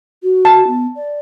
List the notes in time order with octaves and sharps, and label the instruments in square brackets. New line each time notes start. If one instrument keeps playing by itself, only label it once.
[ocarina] F#4
[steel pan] A5
[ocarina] B3
D5